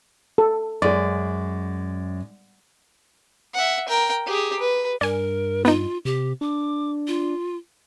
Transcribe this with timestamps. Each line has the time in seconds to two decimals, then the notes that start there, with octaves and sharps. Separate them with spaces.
0.38 A4
0.82 F#2 G#3 D5
3.55 E5 F#5
3.88 A#4 G5
4.27 G4 G#4
4.60 B4
5.01 G2 A#4 D5 G#5
5.65 B3 D#4 F4
6.05 C3 G4
6.41 D4 D6
7.08 F4